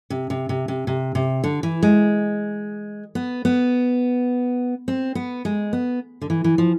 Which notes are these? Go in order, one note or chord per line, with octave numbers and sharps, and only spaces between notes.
C3
C3
C3
C3
C3
C3
D3
E3
G#3
B3
B3
C4
B3
G#3
B3
D3
E3
E3
F3